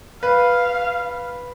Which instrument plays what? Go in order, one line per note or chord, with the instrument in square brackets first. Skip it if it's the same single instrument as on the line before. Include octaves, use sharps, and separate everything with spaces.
[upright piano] B4 [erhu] F5